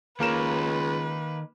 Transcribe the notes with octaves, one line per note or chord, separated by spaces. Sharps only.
C#2 D#3 A#3 A#4 B4 C#5 E7